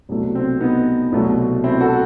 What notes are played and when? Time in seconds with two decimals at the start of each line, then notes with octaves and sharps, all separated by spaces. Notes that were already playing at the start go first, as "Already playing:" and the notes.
0.09 C2 B2 F#3 A3
0.35 C4
0.60 B3 D#4
1.12 C2 B2 F#3 A3
1.64 C4 E4
1.81 F#4 A4